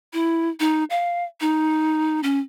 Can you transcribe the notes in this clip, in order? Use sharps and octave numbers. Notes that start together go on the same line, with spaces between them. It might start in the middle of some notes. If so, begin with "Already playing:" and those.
E4
D#4
F5
D#4
C#4